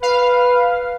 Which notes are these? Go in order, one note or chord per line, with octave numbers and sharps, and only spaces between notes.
B4 F5